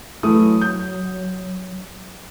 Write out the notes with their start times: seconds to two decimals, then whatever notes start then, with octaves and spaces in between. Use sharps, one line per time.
0.23 E3 F#3 A3 D#6
0.61 G6